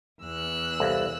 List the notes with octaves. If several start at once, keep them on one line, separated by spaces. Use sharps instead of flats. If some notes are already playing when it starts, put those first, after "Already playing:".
E2 E6 F#6
C2 A4 F5